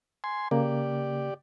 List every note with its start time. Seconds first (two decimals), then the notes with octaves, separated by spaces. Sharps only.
0.24 G#5 C6
0.51 C#3 A#3 G4 D5